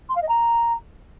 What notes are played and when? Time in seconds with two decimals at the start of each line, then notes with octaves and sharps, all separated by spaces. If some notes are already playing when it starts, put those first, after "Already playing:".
0.09 C6
0.16 F5
0.22 D#5
0.29 A#5